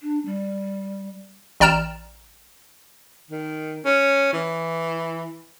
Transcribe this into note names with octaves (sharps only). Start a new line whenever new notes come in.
D4
G3
A1 D5 G5 A#5 F6 E7
D#3
C#4
E3